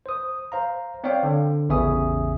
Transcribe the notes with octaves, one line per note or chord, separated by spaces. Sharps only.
C5 D#6
C5 F5 A#5
C4 C#5 D5 F5 G5
D3
A1 E2 C#3 E5 G#5 D#6